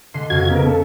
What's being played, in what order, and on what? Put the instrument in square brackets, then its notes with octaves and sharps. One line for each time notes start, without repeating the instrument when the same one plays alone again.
[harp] D3 G#3 [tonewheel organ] C6
[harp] F2 C#3 [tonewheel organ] F#4 G#6
[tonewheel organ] C#3 B3 A#4 [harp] B6
[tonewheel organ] A4